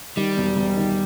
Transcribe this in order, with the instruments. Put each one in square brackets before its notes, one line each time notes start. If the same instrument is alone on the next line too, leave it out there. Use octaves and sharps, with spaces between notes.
[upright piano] D#3 [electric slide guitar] G3
[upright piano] E1
E1
D#3